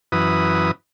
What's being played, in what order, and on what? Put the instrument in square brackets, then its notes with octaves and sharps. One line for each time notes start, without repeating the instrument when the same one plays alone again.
[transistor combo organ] F#2 E3 B4 D#6